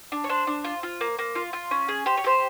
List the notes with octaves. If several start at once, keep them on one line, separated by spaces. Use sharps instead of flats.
D4
C#5
D4 C5
D4
F4
F4
A#3
A#3
F4
F4
C#4
G#4
G4 C5
C#5
G4 C5